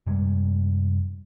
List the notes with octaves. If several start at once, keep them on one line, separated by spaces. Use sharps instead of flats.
F#2 C3 G3 G#3